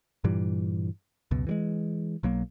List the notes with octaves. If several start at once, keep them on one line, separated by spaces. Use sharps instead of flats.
G2 A#2 E3 G3
C#2 F#2 B2
E3 G3 G#3
B1 F#3 A#3